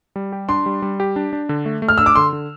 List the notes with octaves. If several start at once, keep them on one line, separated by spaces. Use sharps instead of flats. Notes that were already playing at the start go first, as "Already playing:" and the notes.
G3
G4
D4 C6
G3
G3
G4
D4
D4
D3
A3
A3
F6
D4 E6
D6
D3 C6
D3